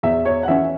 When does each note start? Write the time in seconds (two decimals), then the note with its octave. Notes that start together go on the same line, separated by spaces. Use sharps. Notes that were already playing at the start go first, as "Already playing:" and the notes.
0.03 E2 E5
0.25 C#5
0.43 F#5
0.48 E3 C#4 E5